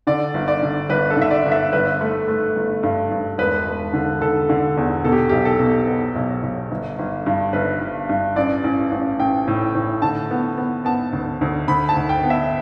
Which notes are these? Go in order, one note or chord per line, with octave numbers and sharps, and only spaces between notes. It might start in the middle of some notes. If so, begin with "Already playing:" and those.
D3 D5
G1
D5
D3
G1 B4
A4
D3 E5
D5
G1
E5
G1 B4
A3
A3
G1
G2
G2
E1 B4
E1
D3
D3 A4
D3
E2
B2 A4
G4
B1 G4
A4
B2
B3
B1
B1
G1
G1
G2
G1 B4
G1
G2
A1 D5
A1
A1
A1 G5
A2
A2
D3 A5
B3
B3
B3 A5
D2
D2
D2 B5
A5
D2
G5
B3
E5